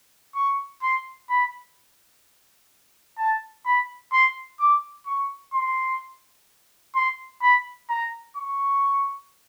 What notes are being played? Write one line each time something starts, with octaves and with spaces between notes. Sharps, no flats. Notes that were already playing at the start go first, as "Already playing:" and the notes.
C#6
C6
B5
A5
B5
C6
D6
C#6
C6
C6
B5
A#5
C#6